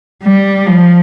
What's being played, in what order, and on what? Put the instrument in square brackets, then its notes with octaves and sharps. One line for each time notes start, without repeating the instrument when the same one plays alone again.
[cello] G3
F3